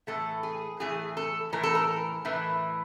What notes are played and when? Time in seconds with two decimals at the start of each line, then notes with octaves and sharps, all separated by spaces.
0.07 A2 E3 A3 A4
0.43 G#4
0.80 A2 E3 A3 G#4
1.17 A4
1.53 A2 E3 A3 A#4
1.63 A4
1.75 A#4
2.25 A2 E3 A3